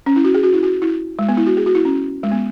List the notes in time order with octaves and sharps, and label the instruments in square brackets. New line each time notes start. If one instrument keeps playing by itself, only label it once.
[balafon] C#4
E4
F#4
G#4
F#4
E4
F#4
E4
G#3
B3
E4
F#4
G#4
F#4
E4
C#4
G#3
B3